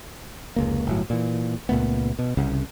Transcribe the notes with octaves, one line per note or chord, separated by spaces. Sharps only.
F1 C#2 A#3
G1 A2 F#3
A#2 E3
C#2 A#2 A3 B3
B2
C2 C#3